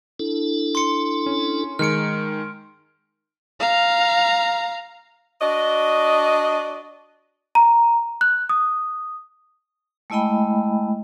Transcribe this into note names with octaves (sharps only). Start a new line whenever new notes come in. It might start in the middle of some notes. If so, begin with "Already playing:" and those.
D4 E4 A4
C6 C#7
C#4
D#3 G#3 F6 C#7 D7
F5 A#5
D4 F#4 D5 D#5
A#5
F#6
D#6
G#3 A3 E4 D#5 G5 B5